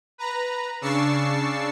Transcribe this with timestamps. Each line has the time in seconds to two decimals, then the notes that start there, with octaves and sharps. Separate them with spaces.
0.18 B4 A#5
0.81 C#3 D4 C#6 E6 A6 C7